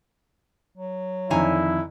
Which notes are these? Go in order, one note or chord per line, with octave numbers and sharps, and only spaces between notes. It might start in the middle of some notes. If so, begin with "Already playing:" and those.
F#3
F2 D3 D#3 E4 G#5 A#5